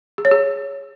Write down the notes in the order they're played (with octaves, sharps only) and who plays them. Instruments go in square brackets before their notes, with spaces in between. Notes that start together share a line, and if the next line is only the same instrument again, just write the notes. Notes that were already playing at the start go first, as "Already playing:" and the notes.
[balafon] G#4
C#5
G#4